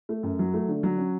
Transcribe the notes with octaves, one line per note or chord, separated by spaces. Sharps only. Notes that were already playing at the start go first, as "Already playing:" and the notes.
A3
F#2
F#3
A3
D3
F#3
C#4